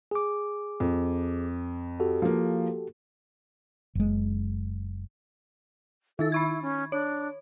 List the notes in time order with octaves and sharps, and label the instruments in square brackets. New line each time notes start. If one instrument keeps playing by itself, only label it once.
[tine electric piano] G#4 D6
[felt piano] F2
[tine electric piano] F#4 G4 A4
[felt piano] F3 A#3
[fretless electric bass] F#1 G#3
[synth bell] D#3 D#4 A6 [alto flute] A4
[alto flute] E4 [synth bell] B5 C#6 G#6
[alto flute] C#4
[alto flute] D4 [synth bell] C#5